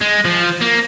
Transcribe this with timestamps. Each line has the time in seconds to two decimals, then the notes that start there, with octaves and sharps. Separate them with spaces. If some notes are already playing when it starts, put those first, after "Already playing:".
0.01 G#3
0.25 F3
0.61 A#3